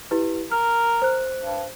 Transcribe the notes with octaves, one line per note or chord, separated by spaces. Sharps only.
E4 G4 B4
A#4 F6
C5 F#6
G2